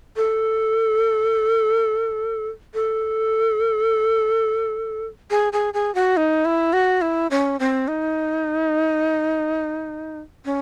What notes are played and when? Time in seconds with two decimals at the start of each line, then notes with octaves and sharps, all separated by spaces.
0.16 A4
2.74 A4
5.31 G#4
5.53 G#4
5.74 G#4
5.95 F#4
6.17 D#4
6.45 E4
6.73 F#4
7.01 E4
7.31 C#4
7.60 C4
7.88 D#4
10.45 C#4